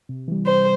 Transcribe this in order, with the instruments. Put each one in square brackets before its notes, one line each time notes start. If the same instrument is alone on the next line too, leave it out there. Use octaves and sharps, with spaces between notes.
[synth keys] C3
E3 G3
[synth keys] C3 [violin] C5